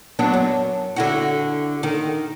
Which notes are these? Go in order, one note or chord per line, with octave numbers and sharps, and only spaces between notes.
F#3 B3 D4
F#2
D3 E4 F#4
D#3